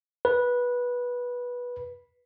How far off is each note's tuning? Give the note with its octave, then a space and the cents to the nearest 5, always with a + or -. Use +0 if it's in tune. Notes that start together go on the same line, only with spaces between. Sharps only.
B4 -15